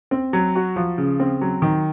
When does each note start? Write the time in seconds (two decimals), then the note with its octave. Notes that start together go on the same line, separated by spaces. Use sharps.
0.11 C4
0.33 F#3
0.55 F#4
0.76 F3
0.98 C#3
1.20 C4
1.41 F#3
1.62 D#3